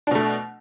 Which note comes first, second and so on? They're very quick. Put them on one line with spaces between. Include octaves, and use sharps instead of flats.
D4 B2 A3